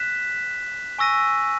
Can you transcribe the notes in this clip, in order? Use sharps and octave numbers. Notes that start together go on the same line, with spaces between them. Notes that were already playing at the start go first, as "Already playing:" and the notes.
Already playing: F#6 B6 E7
G#5 C#6 E6 A#6 D#7